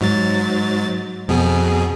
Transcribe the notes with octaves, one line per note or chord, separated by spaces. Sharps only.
G#2 F#3 A6
F2 B2 G#4